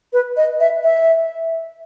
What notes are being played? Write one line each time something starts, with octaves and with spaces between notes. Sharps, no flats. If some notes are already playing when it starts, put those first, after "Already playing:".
B4
D#5
E5
E5